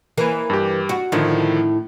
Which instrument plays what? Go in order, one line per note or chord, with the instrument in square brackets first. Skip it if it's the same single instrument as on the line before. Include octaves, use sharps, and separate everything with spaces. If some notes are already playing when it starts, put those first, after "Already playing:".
[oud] E3 A#3 A#4
[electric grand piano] G2 G4
[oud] F#4
[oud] A2 E4 [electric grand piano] D3 D#3 F3